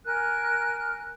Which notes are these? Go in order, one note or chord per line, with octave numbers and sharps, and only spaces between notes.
A#4 G#5 F6 F#6